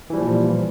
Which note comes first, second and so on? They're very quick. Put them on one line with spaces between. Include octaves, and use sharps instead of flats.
E3 G3 F3 A#2